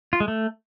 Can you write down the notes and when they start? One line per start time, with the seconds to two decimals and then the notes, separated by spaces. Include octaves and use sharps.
0.13 F4
0.20 G#3
0.28 A3